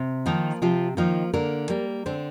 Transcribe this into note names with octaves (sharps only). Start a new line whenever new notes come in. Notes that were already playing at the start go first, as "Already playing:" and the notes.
Already playing: C3
D#3 F3 A#3 D#4
C3 F3 F4
D#3 F3 A#3 D#4
D3 A#3 A#4
G3 A#3
D3 C4 C5